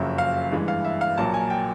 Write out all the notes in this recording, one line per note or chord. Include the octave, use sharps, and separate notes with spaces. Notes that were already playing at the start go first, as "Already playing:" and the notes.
Already playing: F#1 F2 C#3 F#3 E5
F5
G2 E3 G#3
F5
E5
F5
A#1 A#2 F#3 A#3 A5
G#5
G5